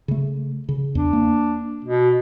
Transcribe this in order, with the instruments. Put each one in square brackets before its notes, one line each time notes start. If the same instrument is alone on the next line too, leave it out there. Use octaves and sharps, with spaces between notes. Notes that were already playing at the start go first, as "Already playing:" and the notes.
[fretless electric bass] C#3 A3
C#3
[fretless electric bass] E2 [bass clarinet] D4
[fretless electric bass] A#3
[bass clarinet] B2